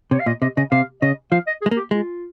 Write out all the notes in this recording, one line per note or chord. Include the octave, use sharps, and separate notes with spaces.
C3 C#5
F5
A#2 D#5
C3 D#5
C#3 D#5
C3 F5
C#3 D#5
F3 F5
D#5
G#4
G#3
A#3
G4
G#3 F4